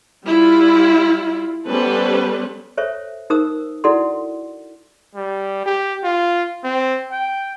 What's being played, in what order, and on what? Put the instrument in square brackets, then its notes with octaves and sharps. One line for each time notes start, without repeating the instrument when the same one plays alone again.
[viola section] G3 E4 F4
G3 B3 C#4 A4 B4 C5
[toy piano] A4 C5 C#5 E5
D#4 A#4 C5 D#6 E6
E4 F#4 A4 D5 F#5 C6
[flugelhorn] G3
G4
F4
C4
G5